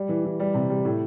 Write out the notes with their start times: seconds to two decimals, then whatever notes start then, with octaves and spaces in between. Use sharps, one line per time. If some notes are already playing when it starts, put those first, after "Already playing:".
Already playing: G3
0.09 E3
0.25 E3
0.40 G3
0.54 C3
0.70 G3
0.85 A2